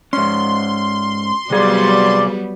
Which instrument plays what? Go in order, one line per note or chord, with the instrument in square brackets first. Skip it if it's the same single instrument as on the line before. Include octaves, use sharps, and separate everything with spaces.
[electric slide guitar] G#2 C#4 [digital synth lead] C6
[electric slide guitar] C3 G#4 [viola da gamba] F#3 G3 B3 [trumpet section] D5